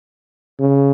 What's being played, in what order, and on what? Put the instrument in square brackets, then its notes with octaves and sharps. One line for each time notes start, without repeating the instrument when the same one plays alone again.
[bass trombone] C#3